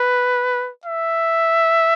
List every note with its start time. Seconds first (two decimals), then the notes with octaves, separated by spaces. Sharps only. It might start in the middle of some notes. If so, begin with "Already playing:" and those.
Already playing: B4
0.85 E5